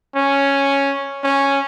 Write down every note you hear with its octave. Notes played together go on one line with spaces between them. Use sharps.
C#4
C#4